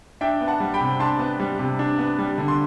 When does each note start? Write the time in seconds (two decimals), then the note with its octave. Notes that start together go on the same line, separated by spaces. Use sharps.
0.21 D4 E5 G5
0.41 B3
0.48 F#5 A5
0.60 G3
0.74 G5 B5
0.81 C3
0.99 D4 A5 C6
1.19 B3
1.40 G3
1.59 C3
1.79 D4
1.99 B3
2.19 G3
2.38 D3
2.48 C6